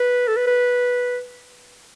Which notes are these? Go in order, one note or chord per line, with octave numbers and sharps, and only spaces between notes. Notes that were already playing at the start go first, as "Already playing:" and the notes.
Already playing: B4
A4
B4
B4